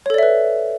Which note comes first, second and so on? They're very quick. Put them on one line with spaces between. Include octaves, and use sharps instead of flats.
C#5 A4 D5 E5 B4